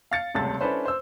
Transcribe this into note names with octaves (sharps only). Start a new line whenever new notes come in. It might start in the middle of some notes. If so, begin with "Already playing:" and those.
F5 A6 C#7
D#1 C#2 C3 A3 A4 A6
C#4 D4 E4 A4 B4 C5
C5 E6